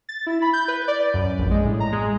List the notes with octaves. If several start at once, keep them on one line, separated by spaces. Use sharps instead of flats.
A6
E4
B5
G6
B4
D5
F#2
A#1
G#3
A2
A#5
G#3